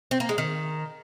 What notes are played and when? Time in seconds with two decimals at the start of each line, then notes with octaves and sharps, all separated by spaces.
0.11 C4
0.20 A#3
0.29 G#3
0.38 D#3